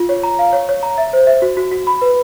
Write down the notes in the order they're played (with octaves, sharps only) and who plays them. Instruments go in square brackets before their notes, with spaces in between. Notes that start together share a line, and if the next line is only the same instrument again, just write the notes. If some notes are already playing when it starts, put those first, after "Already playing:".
Already playing: [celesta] F4
C#5
A#5
F5
C#5
C#5
A#5
E5
C5
E5
F#4
F#4
F#4
B5
B4